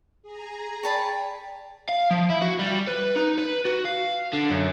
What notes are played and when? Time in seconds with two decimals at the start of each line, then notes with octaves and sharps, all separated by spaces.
0.22 G#4 A#5
0.83 C#5 D5 G5 A5 B5
1.89 F5
2.11 F3
2.30 E4
2.42 F#4
2.59 G3
2.87 B4
3.16 D#4
3.38 B4
3.65 F#4
3.85 F5
4.33 D3
4.50 F#2